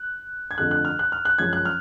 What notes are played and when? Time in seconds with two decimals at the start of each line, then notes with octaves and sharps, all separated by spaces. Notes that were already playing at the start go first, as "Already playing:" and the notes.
Already playing: F#6
0.51 G#6
0.58 F2 D3 F3 A3 F#6
0.71 F#6
0.85 F6
0.99 F#6
1.12 F6
1.25 F#6
1.38 F#2 C#3 F3 G#3 C#4 G#6
1.53 F#6
1.65 F6